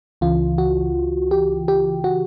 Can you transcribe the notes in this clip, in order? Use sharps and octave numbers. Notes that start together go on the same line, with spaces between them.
C#2 C#3 E3 F4
F#4
G4
G4
F#4